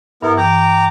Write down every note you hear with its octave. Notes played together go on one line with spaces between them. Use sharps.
G2 B3 E4 A#4
E3 G5 A#5 D6